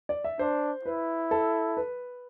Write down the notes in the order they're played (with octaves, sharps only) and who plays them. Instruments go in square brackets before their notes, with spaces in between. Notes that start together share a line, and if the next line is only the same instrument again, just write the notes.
[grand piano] D5
E5
[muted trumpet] D4 [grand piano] C5
[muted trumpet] E4 [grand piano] B4
[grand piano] A4
B4